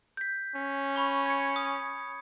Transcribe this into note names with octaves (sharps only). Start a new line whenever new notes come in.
G6 B6
C#4
B5 C#6
G#6 C#7
D#6